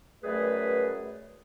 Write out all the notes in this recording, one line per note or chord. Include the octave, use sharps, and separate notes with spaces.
F#2 G3 A3 G#4 B4